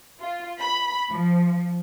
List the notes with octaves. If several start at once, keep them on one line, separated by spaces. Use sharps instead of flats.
F4
B5
F3